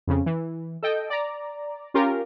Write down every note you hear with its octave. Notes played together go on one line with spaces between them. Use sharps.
F2 C#3
E3
A4 D#5 G5
D5 A#5
C#4 F4 G4 A#4